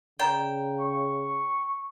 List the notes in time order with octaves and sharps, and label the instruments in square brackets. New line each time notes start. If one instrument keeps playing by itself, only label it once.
[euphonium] C#3 [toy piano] D5 A#5 [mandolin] G5
[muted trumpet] C#6